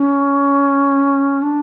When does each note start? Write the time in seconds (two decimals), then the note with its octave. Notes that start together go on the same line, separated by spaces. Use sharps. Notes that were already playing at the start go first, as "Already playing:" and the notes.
Already playing: C#4
1.42 D4